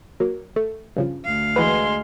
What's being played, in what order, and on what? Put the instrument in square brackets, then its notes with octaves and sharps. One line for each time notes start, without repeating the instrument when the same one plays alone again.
[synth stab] F#3 A#3
A3
G2 C#3 F3
[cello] D2 F5
[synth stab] E3 F#4 B4 [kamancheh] G#3 C6